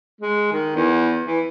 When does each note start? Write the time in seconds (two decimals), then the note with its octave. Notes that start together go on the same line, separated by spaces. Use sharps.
0.21 G#3
0.52 D#3
0.76 E2
1.27 E3